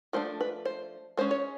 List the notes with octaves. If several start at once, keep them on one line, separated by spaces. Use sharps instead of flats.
F3 A3 D4 C5
B4
C5
G#3 C#4 C5
C#5